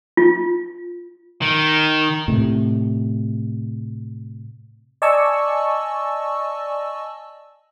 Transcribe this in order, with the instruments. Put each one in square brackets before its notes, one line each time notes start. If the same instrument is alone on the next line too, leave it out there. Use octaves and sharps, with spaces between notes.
[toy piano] F4
[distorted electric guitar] D#3
[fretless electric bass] A2 C3
[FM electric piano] D5 D#5 G#5 A5 C#6 E6